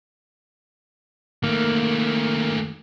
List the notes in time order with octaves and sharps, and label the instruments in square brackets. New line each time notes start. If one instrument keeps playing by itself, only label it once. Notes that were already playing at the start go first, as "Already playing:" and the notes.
[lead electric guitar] D#3 A3 [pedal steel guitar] A#3